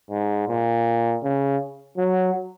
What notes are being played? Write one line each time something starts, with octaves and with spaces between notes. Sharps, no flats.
G#2
A#2
C#3
F#3